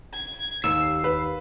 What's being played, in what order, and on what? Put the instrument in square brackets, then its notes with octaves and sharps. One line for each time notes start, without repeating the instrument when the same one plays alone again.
[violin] G#6
[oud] D#2 [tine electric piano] E6 [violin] C7
[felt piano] B4